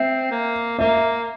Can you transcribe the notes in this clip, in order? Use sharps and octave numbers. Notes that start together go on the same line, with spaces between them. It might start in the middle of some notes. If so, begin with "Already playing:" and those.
Already playing: C4 E5
A#3
A#3 E5